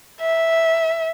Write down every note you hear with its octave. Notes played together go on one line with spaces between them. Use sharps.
E5